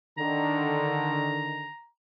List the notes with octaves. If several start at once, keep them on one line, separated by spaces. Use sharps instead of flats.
D3 D#3 A#5